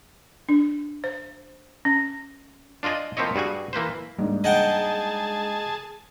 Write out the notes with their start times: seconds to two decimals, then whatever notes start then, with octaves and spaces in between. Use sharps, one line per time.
0.49 D4
1.04 C5
1.85 C#4
2.83 D4 F4 D5 D#5 G#5
3.17 F3 A#3 C4 E4 C#5 D#5
3.35 G2 G3 F#4 G#4 G#5
3.73 E3 A#3 B4 C5
4.18 G#2 G3 A#3 D4
4.44 G#4 D#5 F#5 G5 A5